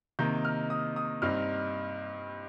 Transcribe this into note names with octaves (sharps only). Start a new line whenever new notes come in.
C3 D#3 A#3 D#4 G6
F6
D#6
D#6
G2 G3 C4 D#4 F6